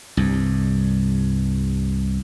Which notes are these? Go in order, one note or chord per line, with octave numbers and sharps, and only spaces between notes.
C2 G2